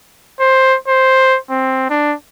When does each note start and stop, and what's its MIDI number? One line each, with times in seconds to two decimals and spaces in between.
0.40 0.76 72
0.88 1.38 72
1.50 1.85 60
1.89 2.14 62